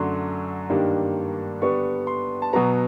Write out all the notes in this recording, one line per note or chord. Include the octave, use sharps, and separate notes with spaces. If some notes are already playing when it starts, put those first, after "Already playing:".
Already playing: F#2 D3 F#3 A3 D4 C6
G2 D#3 G3 A#3 D4
D3 G3 B3 D4 C#6
C6
A5
B2 F#3 B3 A#5